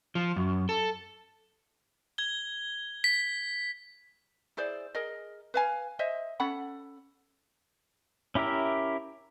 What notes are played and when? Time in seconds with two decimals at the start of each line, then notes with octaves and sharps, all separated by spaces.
0.15 F3
0.36 F#2
0.69 A4
2.18 G#6 G7
3.04 B6
4.57 E4 G#4 C5 D5
4.95 G#4 A#4 D#5
5.54 B4 F5 G#5
5.99 C5 D#5 E5
6.40 C#4 A4 F#5 B5
8.35 C#4 E4 G4 A#4 E5